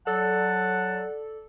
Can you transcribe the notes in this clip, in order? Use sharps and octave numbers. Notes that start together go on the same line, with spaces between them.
F#3 A4 D5 F#5 A5